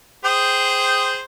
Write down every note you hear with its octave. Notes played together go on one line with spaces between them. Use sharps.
G#4 C5 G5